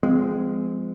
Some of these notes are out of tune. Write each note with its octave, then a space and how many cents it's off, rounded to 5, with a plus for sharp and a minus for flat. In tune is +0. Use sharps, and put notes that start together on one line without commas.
F3 +0 G#3 -5 C4 -35